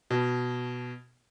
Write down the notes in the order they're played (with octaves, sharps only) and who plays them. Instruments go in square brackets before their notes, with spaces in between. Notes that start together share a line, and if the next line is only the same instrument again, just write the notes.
[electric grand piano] B2